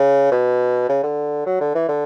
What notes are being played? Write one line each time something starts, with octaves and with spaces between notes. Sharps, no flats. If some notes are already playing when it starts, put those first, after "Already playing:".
Already playing: C#3
B2
C#3
D3
F#3
D3
E3
D3